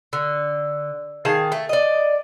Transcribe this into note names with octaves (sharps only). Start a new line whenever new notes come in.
D3
D#3 G#4 F5 A5
A3
D5 D#5